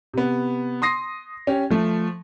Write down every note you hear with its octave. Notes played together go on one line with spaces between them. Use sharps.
C3 B3
C6 D#6 A#6 C7
C#4 G4
F3 A3